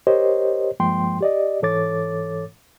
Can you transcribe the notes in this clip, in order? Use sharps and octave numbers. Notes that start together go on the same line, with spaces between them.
G4 A#4 C5 C#5 D#5
G2 F3 G#3 A#3 G5 C6
G4 D5 D#5
G#2 E3 A4 C#5 D6 A6